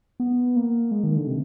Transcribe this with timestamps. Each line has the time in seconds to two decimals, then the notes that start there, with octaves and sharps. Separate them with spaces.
0.20 B3
0.56 A#3
0.91 G#3
1.04 D#3
1.16 D3
1.27 C3